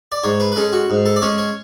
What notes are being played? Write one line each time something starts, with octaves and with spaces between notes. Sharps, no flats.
D5
G#2 C#5
B4
B4
G#3 C#4 A4
F#4
G#2
A4
D5
G#3 C#4 C#5
C#5